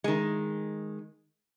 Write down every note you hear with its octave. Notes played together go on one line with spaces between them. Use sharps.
D#3 G#3